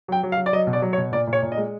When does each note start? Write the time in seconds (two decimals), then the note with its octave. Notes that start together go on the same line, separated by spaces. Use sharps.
0.08 F#3 G5
0.23 F#3
0.32 F5
0.37 F#3
0.46 D5
0.53 F#3 D#5
0.67 B2
0.73 D5
0.82 F#3
0.93 C#5
0.98 B2
1.12 A#2 D5
1.27 A#2
1.33 C#5
1.42 A#2
1.52 D#5
1.58 G#3